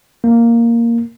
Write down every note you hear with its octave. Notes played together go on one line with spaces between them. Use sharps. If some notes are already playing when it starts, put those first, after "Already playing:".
A#3